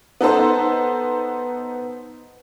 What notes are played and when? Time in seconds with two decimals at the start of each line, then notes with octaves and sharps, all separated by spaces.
0.21 B3 D#4 A4 C5